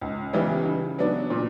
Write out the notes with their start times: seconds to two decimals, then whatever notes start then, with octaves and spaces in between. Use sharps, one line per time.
0.01 C#2
0.33 C#3 E3 G3 B3
0.66 C#3
0.98 F#3 B3 D4
1.30 A#2